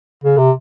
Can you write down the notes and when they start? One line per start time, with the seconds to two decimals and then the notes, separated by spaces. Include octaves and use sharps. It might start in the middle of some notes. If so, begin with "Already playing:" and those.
0.24 C#3
0.38 C3